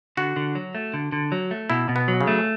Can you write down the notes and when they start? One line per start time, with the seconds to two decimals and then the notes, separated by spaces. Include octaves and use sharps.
0.17 D3 F#4
0.36 D3
0.55 F#3
0.75 A3
0.94 D3
1.12 D3
1.32 F#3
1.51 A3
1.70 B2 E4
1.89 B2
1.96 B3
2.08 F#3
2.21 C#3
2.27 A3